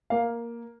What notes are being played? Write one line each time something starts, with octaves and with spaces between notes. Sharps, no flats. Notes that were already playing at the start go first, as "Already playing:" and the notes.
A#3 F5